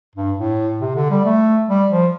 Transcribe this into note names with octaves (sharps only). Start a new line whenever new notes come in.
G2
A2
C3
D3
G3
A3
G3
F3